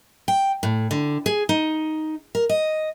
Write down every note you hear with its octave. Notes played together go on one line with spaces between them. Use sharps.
G5
A2
D3
G#4
D#4
A#4
D#5